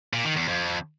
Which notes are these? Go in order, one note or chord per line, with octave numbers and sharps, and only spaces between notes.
A#2
D#3
E2
F2